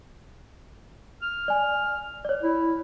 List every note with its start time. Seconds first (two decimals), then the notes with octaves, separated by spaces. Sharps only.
1.22 F6
1.48 D5 G#5
2.25 C#5 D5
2.43 E4